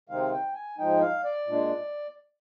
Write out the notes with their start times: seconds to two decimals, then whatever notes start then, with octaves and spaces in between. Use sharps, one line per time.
0.09 C3 D#3 G#3 C4 D#4 F5
0.32 G5
0.55 G#5
0.78 G#2 F3 G#3 D#4 G5
1.01 F5
1.24 D5
1.47 A#2 G#3 D4